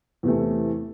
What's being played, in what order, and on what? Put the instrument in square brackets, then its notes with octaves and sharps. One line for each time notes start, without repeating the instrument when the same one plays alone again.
[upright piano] E2 C3 E3 A3